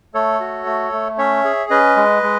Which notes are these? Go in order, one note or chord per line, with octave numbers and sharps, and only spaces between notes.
A3 A4 C#5
F#4
A3
A3
C#4 C#5 E5
G#4
C#4 B4 D#5
G#3
G#3